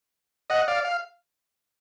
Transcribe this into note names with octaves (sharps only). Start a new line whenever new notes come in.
D#5 F#5
D5 F5
F5